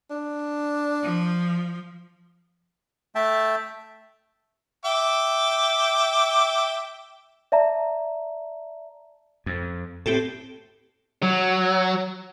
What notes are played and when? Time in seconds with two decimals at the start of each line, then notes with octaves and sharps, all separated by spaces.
0.10 D4
1.02 F3
3.15 A3 E5 G5 A5
4.85 E5 G5 D6
7.52 D5 E5 A5 A#5
9.46 F2
10.06 A2 C4 G4 A4
11.23 F#3